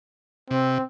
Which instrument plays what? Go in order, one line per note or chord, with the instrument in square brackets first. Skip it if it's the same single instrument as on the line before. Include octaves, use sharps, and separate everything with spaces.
[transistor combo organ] C3 [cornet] C4